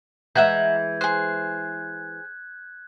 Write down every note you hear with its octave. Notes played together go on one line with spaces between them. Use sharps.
E3 G#3 E5 F#5 A#5 G6 G#6
G#4 C5 F#6